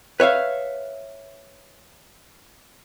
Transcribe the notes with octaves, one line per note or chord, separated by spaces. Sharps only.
B4 C#5 E5 F5